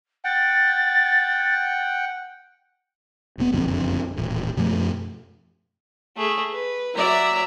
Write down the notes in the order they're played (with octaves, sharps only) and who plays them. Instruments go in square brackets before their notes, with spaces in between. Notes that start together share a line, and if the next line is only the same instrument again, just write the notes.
[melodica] F#5 G5 [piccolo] A6
[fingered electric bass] E1 B2 B3
F#1 B1 F2 D3
D#1 A1
F#2 B2 F3 A3
[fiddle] A3 G#4
B4
[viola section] F#3 D5 E5 [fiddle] A#5